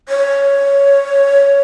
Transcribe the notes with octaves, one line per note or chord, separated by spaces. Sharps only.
C#5